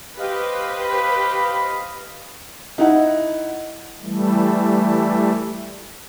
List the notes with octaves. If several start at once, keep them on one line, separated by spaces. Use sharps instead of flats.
G4 B4 C5 D#5 F5
B5
D#4 E4 F#5
E3 G3 A3